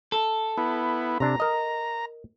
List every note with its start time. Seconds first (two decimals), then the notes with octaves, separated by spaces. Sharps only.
0.12 A4
0.58 B3 E4
1.20 C3 D4 A#5
1.40 A#4 D#5